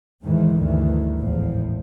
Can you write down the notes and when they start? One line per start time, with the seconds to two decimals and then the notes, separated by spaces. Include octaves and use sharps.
0.22 E2 G#2 D#3 E3
0.54 G1 D2 D#3 E3
1.17 G#1 E2 A2 F3